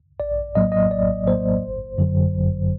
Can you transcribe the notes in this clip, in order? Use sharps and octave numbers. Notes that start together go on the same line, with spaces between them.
A#1 D5
A2 F#3 A#3 D#5
D#5
A#1 D5
A2 F#3 A#3 C5
G1
F#2 D3 F#3
G1